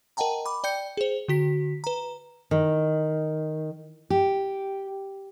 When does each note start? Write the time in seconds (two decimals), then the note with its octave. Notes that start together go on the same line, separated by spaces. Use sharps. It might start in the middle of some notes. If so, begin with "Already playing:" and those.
0.17 A#4 D#5 F#5 G5 A5 A#5
0.46 B5 D6
0.64 D5 G5 G6 C#7
0.97 G#4 C5
1.28 D3 F#4 B6
1.84 B4 A#5
2.51 D#3
4.10 G4